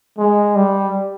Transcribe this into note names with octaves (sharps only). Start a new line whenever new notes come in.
G#3
G3